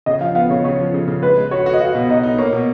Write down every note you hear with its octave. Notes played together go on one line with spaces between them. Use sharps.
C#3 D#5
F3 F5
B3 F5
C#3 C#5
C#3 C#5
F3
C#3
C#3
G#3 B4
G#3
F#4 C#5
F#4
D#5
F#4 F5
B2
D#4 D#5
D#4
A#3 C#5
B2